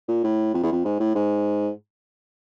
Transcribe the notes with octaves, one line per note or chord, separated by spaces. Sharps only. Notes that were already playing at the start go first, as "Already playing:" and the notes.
A#2
A2
F2
E2
F2
G#2
A2
G#2